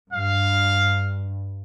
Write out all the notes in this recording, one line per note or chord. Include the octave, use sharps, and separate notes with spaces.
G2 F5